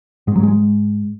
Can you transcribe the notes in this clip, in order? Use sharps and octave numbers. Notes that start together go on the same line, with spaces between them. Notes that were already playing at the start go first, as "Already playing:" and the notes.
G#2 G#3
F#3
G#3